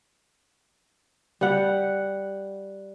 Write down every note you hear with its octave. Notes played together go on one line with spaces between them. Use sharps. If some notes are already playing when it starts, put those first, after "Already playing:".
G3 F#5